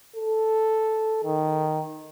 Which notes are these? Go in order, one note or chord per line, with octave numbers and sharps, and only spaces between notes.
A4
D#3